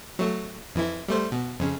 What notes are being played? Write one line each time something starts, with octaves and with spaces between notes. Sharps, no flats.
F#3 A3
F2 E3 E4
G3 A3 C5
B2
F2 C#3